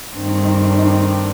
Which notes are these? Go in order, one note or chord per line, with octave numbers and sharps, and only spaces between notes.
G2 D#3 A3 C4 D4
D#4
D4
D#4
D4
D#4
D4
D#4
D4
D#4
D4